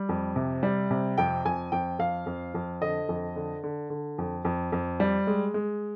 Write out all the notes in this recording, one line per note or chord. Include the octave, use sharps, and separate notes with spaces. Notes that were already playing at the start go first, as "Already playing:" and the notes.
Already playing: G3
F2
C3
G3
C3
F2 G5
F2 G#5
F2 G5
F2 F5
F2
F2
D3 D#5
F2
D3
D3
D3
F2
F2
F2
G3
G#3
G#3